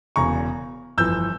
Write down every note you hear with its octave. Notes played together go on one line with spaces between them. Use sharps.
E1 E2 C#3 A#5 C#6
G1 F2 E3 E6 G6